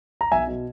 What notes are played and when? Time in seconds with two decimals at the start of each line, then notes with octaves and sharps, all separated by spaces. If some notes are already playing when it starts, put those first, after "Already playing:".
0.21 A#5
0.32 B1 E5 G#5
0.48 B2